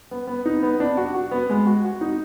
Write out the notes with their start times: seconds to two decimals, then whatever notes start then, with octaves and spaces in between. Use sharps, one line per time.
0.11 B3
0.27 B3
0.46 D#4
0.63 B3
0.80 D4
0.97 F#4
1.14 F#4
1.31 B3
1.50 G#3
1.66 F#4
1.84 F#4
2.01 D#4